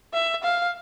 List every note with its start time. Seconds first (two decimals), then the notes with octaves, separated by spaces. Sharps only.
0.14 E5
0.44 F5